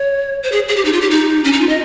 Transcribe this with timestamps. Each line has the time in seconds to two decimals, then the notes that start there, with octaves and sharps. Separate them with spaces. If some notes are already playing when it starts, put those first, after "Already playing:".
Already playing: C#5
0.43 C5
0.52 G#4
0.68 G#4
0.76 G4
0.85 D#4
0.93 F4
1.01 G4
1.10 D#4
1.44 C#4
1.53 D#4
1.61 F4
1.69 D#5